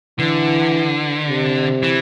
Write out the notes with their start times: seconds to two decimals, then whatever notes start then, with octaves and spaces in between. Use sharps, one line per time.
0.19 D3 E3
1.29 C3
1.83 E3